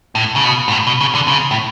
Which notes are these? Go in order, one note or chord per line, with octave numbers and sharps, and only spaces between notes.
A2
C#3
B2
G#2
A2
B2
C#3
D3
C#3
A2